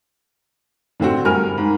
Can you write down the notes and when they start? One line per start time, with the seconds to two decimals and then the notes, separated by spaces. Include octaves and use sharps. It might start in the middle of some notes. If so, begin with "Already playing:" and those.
1.00 A2 D3 C4 F#4
1.25 G2 A#4 G#5 F6
1.57 G#2